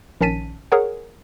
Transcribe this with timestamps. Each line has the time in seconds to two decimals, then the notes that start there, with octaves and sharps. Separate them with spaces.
0.21 A#1 D#3 C#4 A5 B6 D#7
0.72 G#4 A#4 C#5 F#5